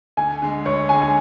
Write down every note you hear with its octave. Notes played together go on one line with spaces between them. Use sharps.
D2 G#5
D3 G#3
D2 C#5
D3 G#3 G#5
G#5